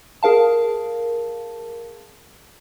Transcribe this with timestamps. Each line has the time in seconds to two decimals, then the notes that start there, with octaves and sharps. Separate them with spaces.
0.23 G#4 A#4 F5 A5